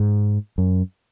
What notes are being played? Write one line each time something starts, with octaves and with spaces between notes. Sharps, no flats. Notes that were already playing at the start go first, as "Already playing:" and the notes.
Already playing: G#2
F#2